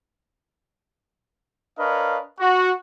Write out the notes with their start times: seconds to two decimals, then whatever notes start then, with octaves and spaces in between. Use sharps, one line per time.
1.79 D4 A#4 B4 C#5 D#5 F5
2.41 F#4